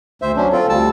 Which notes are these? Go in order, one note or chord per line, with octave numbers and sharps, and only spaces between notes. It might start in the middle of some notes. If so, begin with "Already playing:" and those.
D2 C5 E5
F#3 C#4 D4
C4 F4 A4
D2 G3 A5 E6